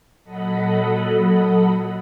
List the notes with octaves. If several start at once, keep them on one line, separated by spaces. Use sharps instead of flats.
A#2 F#3 A4 D#5 F#5 B5